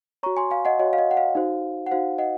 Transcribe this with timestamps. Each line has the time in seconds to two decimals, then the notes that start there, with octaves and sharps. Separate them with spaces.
0.23 F#4 C#5 A#5 C#6
0.37 G#5 C6
0.51 F5 G#5
0.65 D#5 F#5
0.79 F#4 C#5 D#5
0.93 F5
0.98 D#5
1.11 F#5
1.17 F5
1.35 D#4 F#4 C5
1.87 F#5
1.91 D#4 F#4 C5 F5
2.18 D#5 F#5